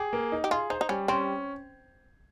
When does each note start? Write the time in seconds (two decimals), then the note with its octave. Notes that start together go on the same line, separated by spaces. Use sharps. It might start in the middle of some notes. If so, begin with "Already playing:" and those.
Already playing: G4 G#4
0.13 A#3
0.32 D#4
0.44 G4
0.51 F4 G#4
0.70 D#4 C5
0.81 D#4
0.89 G3 C#4
1.08 C4 C#4